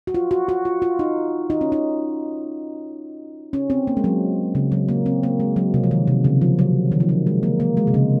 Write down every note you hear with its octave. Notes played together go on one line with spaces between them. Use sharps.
F#4
F4
F#4
F#4
F4
F4
D#4
D#4
C#4
D#4
C#4
C4
A#3
G#3
F#3
C#3
F#3
A#3
C4
A#3
G#3
F#3
C3
F3
D#3
C3
C#3
F3
F#3
D#3
F3
F#3
G#3
A#3
A#3
G#3
C3
C#3